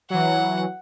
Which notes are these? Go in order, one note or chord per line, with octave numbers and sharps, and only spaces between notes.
E3 F#3 F#5